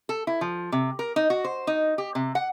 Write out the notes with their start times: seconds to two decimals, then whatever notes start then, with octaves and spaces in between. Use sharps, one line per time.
0.09 A4
0.27 E4
0.41 F3
0.72 C3
0.99 A#4
1.16 D#4
1.30 F#4
1.44 C5
1.67 D#4
1.98 G4
2.15 C3
2.35 F#5